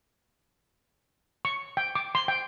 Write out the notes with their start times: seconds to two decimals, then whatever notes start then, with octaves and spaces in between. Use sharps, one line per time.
1.45 C#6
1.77 G5
1.95 D6
2.15 C6
2.28 G5